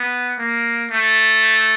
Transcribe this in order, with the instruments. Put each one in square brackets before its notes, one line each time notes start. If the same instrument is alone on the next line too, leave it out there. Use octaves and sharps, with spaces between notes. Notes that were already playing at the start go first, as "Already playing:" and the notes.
Already playing: [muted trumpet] B3
A#3
A3